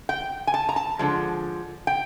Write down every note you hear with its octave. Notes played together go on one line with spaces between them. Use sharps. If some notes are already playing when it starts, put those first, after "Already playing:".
G5
G#5
A5
A#5
A5
D3 F3 G#3
G5